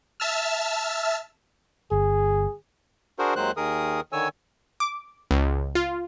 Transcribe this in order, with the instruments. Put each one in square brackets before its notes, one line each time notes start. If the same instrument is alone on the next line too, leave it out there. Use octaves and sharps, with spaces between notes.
[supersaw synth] E5 A5 E6 F6
[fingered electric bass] G1 [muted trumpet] G#4
[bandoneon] D4 F#4 G#4 A#4 C5
D#2 D#3 F#3 G#3 C5 F#6
D#2 D#3 G#4 A#4 D#6
D3 D#3 C#5 G#5 E6
[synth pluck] D6
C#2
F4